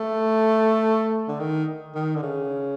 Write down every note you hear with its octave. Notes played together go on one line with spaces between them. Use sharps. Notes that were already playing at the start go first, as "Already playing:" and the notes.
Already playing: A3
D3
D#3
D#3
D3
C#3